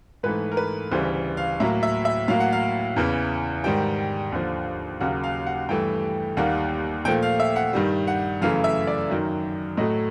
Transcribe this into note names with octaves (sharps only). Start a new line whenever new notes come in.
G#2 E3 A3 B4
A#4
B4
D2 C#3 E3 G3 C5
F5
A2 F#3 A#3 E5
E5
E5
A2 F#3 A#3 F5
F#5
F5
E2 C#3 E3
G#2 D#3 G3 G5
D#2 D3 F3
D#2 C#3 F#3 A#3 F#5
F5
F#5
G2 E3 A3 G5
D#2 D#3 G3 A#3 F#5
A#2 F3 A3 G5
F5
E5
F#5
G2 D#3 G3
F#5
F#2 C#3 E3 A3 F5
E5
D5
F#2 D#3 F#3
A2 F#3 A3 D#5